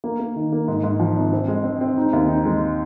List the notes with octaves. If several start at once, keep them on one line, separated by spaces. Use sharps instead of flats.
A#3
A#3
D#3
A#3
G#2
G#2
F3
G#1
C4
G#3
C4
C4
D#4
D#2
D#4
G#3